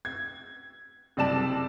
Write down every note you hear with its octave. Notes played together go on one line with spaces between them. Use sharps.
G#6
F#1 C3 G3 D5 A5 E7